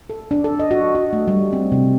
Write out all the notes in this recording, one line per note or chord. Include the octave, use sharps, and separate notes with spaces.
A4
D4
A4
D#5
F#4
F#4
A3
G3
C4
C3